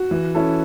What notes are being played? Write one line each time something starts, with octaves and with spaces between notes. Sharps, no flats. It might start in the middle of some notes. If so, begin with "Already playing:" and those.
Already playing: F#4
E3
C#4 E4 A4